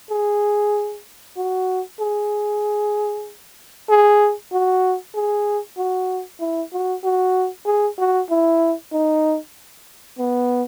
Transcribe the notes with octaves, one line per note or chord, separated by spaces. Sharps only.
G#4
F#4
G#4
G#4
F#4
G#4
F#4
E4
F#4
F#4
G#4
F#4
E4
D#4
B3